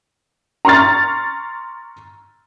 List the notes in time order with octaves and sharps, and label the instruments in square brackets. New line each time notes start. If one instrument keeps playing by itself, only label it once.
[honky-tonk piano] A#5 C6 C#6 F6 A6